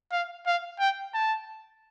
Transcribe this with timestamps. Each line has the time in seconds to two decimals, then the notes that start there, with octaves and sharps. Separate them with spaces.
0.12 F5
0.46 F5
0.79 G5
1.14 A5